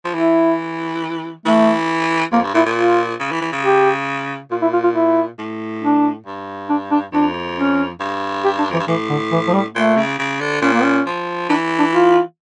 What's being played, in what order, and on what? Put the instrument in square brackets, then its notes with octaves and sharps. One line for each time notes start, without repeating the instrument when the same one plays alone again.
[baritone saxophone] F3
[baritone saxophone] E3 [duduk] E4
[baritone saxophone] E3 [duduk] A3
[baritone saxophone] F2 [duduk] A#3
[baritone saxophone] G2
[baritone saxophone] A#2 [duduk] E4
[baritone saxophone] A#2
[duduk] F4
[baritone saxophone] C#3
E3
E3
C#3
[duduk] G4
[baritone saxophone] A#2 [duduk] F4
[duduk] E4
F4
F4
E4
[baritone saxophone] A2
[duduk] D4
[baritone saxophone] G2
[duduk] D4
D4
[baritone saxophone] F2 [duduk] D4
[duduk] C#4
[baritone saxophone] G2
[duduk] G4
D4
[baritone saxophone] F2 [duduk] E3
[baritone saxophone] G2
[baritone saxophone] A2 [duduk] E3
[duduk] D3
E3
F3
G3
[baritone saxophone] A#2 [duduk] A3
[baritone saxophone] C#3
C#3
D3
[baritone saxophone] A#2 [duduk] C#4
[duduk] A#3
C#4
[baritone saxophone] F3
[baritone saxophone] E3 [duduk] D4
[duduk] D4
F4